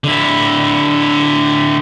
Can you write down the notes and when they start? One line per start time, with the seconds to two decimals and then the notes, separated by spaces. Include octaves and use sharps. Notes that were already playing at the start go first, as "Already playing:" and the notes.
0.04 D3 E4